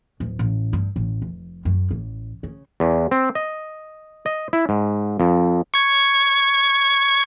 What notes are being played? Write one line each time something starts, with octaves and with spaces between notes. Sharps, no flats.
D1
A1
G2
A1
F1
F#2
A1
C#3
E2
C4
D#5
D#5
E4
G#2
F2
C#6 G#6